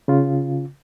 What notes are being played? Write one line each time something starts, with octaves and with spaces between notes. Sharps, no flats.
C#3 F4